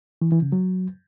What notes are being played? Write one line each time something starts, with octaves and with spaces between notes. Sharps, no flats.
E3
E3
C#3
F#3